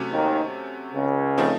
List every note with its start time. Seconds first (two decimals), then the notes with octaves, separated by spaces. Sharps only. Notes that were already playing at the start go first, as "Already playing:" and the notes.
Already playing: C3 F#3 A3 C#4 F#4
0.11 D#2 D#3
0.95 C#2 C#3
1.38 F3 A3 C4 D#4